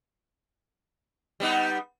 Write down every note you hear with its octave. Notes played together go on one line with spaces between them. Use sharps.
G3 B3 D#4